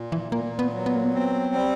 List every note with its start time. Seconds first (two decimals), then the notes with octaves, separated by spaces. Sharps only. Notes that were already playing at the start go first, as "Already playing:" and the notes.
Already playing: A#2
0.12 E3
0.32 A#2 A#3
0.59 B3
0.73 F#3
0.86 B3
0.95 A#3
1.04 B3
1.14 C4
1.54 G3